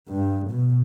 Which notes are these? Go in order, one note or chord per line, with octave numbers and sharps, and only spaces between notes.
G2
B2